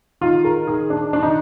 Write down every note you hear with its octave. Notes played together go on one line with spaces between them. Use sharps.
D#3 F4
A#4
D#3 G#4
D4
D#3 D4
D#4